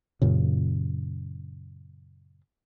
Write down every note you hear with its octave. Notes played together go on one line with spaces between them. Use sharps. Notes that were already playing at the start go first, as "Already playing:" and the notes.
F#2 A#2 C#3